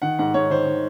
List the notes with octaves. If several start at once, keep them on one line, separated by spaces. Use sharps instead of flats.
D#3 F#5
G#2 F#5
G#2 C#5
D#3 C5
D#3